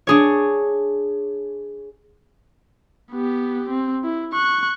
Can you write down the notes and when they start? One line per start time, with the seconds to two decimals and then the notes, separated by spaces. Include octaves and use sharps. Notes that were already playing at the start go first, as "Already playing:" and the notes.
0.07 D4 G#4 C#5
3.11 B3 G4
3.70 C4
4.04 E4
4.33 C#6 F#6